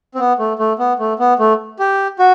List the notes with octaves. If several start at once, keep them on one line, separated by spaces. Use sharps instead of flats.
C4
B3
A3
A3
B3
A3
B3
A3
G4
F#4